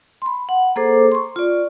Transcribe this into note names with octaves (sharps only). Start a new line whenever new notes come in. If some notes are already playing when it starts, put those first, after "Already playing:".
B5 C6
F#5
A#3 G#4 A4 C5 D6
C6 C#6
F4 D5